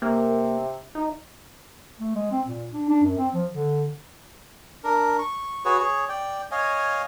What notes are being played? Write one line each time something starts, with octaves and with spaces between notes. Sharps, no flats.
C3 A#3
D#4
A3
G#3
C4
A#2
D4
D4
F#2
C4
F3
D3
D4 A#4
C#6
F#4 G#4 B4 C#5
G#4 C#5
D5 G5
C#5 D#5 F5 G#5